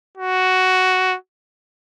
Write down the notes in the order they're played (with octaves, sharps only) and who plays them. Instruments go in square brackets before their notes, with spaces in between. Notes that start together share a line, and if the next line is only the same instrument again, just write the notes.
[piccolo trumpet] F#4